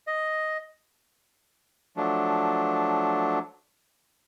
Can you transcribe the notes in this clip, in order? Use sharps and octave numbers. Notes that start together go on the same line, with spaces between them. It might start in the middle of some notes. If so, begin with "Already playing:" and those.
D#5
F3 F#3 A3 D4